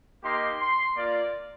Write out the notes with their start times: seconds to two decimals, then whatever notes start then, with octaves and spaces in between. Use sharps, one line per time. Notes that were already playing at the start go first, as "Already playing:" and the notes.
0.23 A#3 D#4 G4 C6
0.59 C6
0.95 A#3 F4 D5